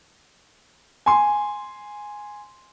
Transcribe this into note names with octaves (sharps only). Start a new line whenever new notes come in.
G#5 C6